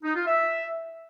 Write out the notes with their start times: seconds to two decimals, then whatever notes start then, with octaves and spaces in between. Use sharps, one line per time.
0.04 D#4
0.15 F4
0.27 E5